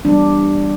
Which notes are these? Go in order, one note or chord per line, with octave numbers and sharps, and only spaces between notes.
E3 G3 B3 D4